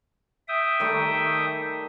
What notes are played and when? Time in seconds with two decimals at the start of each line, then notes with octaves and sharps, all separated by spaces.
0.48 E5 G5 D#6
0.80 D#3 G3 A3